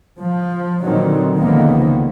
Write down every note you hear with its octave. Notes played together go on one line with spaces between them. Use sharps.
F3
A#2 D3 D#3 F#3 C4
C#2 D3 D#3 F3 A#3 B3